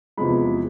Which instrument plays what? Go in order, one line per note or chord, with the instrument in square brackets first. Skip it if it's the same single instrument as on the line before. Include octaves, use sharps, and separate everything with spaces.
[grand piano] E2 C3 F3 G#3 B5